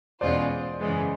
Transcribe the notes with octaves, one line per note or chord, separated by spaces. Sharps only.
E2 B2 G#3 C#4 F4 C5 D5
F#2 C#3 E3 G#3 B3